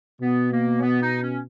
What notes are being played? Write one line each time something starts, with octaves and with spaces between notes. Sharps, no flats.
B2 B3
A#3
C#4
B3
D#4
C#4